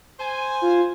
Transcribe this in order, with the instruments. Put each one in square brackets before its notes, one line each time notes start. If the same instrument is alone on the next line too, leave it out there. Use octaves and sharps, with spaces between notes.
[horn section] C5 G#5
[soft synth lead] F4